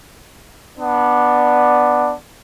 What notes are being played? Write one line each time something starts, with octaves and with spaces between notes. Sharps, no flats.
B3 D4 D5